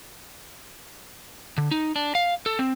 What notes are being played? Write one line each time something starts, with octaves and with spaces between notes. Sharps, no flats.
D3
D#4
D4
F5
A4
C4